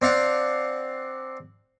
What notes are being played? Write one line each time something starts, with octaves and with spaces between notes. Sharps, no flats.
C4 D4 F5 F#5